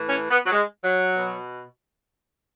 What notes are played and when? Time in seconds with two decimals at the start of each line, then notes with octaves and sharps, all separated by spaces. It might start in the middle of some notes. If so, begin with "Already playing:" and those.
Already playing: A2 E3
0.09 C#4
0.30 B3
0.46 F#3
0.52 G#3
0.84 F#3
1.16 B2